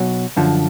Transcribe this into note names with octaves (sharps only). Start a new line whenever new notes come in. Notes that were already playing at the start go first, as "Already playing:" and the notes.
Already playing: B1 B2 F#3
F#2 D3 F3